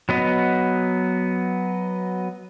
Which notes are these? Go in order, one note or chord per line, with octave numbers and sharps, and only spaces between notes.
F#3 B3 D#5